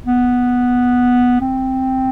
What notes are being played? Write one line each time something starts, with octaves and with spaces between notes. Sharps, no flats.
B3
C4